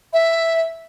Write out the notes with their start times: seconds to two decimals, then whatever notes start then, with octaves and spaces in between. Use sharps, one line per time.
0.13 E5